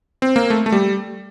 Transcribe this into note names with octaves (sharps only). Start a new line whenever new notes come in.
C4
A#3
A3
A3
G3